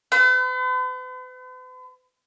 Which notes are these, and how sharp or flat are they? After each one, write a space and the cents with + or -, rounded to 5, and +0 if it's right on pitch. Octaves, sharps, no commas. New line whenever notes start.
B4 +45